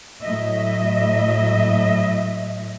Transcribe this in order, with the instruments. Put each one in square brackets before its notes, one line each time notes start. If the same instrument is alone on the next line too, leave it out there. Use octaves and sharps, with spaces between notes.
[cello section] A2 F#3 D#5 E5